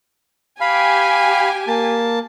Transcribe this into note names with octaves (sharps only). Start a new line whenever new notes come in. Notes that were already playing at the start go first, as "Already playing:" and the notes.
G4 F5 G#5 B5
A#3 A5